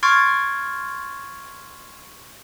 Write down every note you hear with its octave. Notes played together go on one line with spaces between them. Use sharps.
C6 C#6 F6 G#6 A6 D7